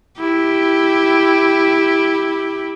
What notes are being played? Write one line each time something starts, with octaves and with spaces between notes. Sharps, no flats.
E4 G4